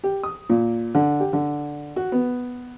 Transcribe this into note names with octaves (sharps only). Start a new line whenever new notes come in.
G4
D#6
A#2
D3
G4
D3
F#4
B3